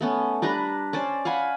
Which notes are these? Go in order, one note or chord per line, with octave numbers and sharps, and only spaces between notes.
A3 B3 C#4
G3 D4 B4 A#5
C#4 C5 D5
F5 F#5 G#5 B5